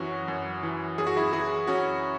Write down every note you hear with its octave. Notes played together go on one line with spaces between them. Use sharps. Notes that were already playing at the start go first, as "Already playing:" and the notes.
Already playing: F#2 E3 C#4 F#4
F#2
E3
F#2 G#4
F#4
E4 G#4
E3 E4 G#4
F#2 C#4 F#4